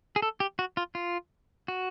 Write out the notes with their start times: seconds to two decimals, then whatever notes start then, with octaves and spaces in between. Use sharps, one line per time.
0.16 G#4
0.22 A4
0.40 G4
0.59 F#4
0.77 F4
0.95 F4
1.68 F#4